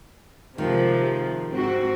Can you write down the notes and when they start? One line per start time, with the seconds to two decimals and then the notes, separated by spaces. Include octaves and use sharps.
0.58 C3 D#3 F3 G#3
1.51 G#2 C4 F#4